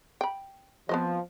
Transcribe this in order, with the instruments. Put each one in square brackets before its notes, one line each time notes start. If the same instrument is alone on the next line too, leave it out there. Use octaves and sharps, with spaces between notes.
[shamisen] G5 B5
[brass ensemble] F3 [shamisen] B3 C4 D#5